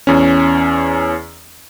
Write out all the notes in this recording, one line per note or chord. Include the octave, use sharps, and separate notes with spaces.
E2 C#4